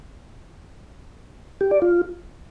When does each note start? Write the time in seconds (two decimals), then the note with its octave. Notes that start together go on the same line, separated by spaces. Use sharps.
1.61 G4
1.71 D5
1.82 F4